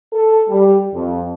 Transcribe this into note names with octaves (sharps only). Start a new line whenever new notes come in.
A4
G3
F2